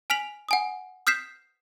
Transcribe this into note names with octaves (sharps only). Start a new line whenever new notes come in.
G#5 F6 B6 F7 F#7
F#5 G#5 D#6
D#6 F6 G6 B6 C7 E7